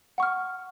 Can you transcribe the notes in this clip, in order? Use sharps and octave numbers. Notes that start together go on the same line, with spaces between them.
F#5 C#6 F6